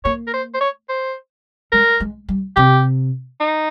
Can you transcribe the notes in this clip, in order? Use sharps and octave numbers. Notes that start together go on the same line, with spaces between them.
A#3 C#5
A#4
C5
C5
C#5
C5
G#3 A#4
G#3
G3
C3 G4
D#4